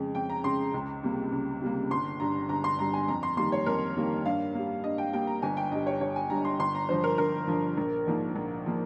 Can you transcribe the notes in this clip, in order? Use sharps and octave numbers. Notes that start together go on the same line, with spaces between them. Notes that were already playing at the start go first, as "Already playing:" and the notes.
Already playing: F2 C#3 G#3
F2 G5
A#5
C#3 G#3 C6
C#2
C3 G3 A#3
C#2
C3 G3 A#3
G1 C6
G2 G3 A#5
G1 A#5
C6
G2 G3 A#5
G#5
F2 A#5
C6
D#3 G3 A#3 C6
C#5
F2 A#4
D#3 G3 A#3
G2 F5
G3 A#3
G2 D#5
G5
G3 A#3 G5
A#5
G1 G#5
G5
G2 G3 D#5
C#5
G1 C#5
G#5
G2 G3 A#5
C6
G1 C6
A#5
G2 F3 C5
A#4
G1 A#4
G2 F3
A#1
G#2 F3 A#3
A#1
F3 A#3